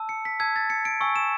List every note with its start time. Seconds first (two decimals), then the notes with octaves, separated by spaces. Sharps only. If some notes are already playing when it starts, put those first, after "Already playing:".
Already playing: A5 E6
0.09 C#7
0.25 B6
0.40 A5 E6 G#6
0.56 A6
0.70 C#7
0.85 D7
1.01 G#5 C#6 E6
1.16 E7